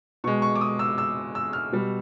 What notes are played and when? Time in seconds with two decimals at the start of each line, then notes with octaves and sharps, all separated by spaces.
0.24 B2 G#3 C#6
0.42 C#6
0.55 D6
0.61 D#6
0.79 E6
0.98 E6
1.35 E6
1.53 F6
1.72 B2 G3